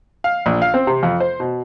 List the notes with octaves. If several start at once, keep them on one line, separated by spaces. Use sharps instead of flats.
F5
A#1
F5
C4
C3
F2
C5
B2